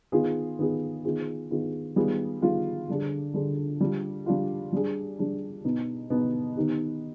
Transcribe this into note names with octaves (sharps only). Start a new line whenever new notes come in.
D#3 B3 F4 G#4
D#3 B3 F4 G#4
D#3 B3 F4 G#4
D#3 B3 F4 G#4
D#3 G3 B3 F4 G#4
D#3 G3 B3 F4 G#4
D3 G3 D4 G#4
D3 G3 D4 G#4
G3 D4 F4
G3 D4 F4
G3 D4 G#4
G3 D4 G#4
B2 B3 D#4
B2 B3 D#4
D#3 B3 D#4 G4